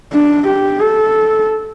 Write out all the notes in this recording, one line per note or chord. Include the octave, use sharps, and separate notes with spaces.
D4
G4
A4